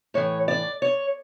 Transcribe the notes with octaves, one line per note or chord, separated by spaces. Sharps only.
A2 E3 C#5
D5
C#5